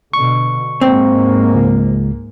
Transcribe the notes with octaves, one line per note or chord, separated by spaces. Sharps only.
B2 D3 C#6
G#2 A#3 C4
C#2